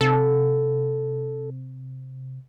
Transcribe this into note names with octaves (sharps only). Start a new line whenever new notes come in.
C3 A4